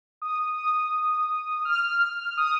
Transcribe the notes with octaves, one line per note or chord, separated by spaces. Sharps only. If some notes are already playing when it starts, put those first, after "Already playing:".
D#6
D#6
F6
D#6